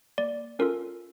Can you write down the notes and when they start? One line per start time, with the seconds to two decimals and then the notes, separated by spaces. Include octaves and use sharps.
0.18 A#3 D5
0.59 C#4 F4 A4 A#4